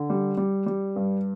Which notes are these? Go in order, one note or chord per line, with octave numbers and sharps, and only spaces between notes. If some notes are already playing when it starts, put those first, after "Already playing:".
Already playing: D3
G3
G3
G3
G2